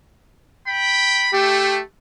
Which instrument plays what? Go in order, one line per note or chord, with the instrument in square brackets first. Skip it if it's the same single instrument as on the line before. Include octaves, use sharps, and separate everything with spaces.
[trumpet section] G5 B5
[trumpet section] A3 [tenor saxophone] G4